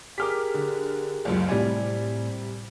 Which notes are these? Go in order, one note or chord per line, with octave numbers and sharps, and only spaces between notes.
G4 G#4 A#4 D6 F6 B6
D3
F#1 C#2 F#2
A2 C3 G3 D5 G#5